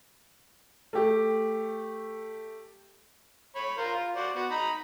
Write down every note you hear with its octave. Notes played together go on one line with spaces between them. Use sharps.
A3 G4
C#5 B5
F4 A#4 C5
F4
F#4 C5 D5
B3 F#4
D#4 A#5 B5